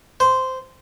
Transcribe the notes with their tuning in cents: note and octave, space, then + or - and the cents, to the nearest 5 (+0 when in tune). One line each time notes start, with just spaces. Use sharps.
C5 -10